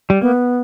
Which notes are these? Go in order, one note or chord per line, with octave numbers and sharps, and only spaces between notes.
G3
A#3 B3